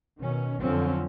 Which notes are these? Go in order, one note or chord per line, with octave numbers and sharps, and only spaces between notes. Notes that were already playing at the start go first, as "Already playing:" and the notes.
B2 D#3 C#4
F2 D3 F3 F#3 C4 C#4